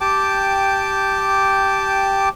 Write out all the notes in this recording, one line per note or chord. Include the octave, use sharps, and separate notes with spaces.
G4 G5 A5 D6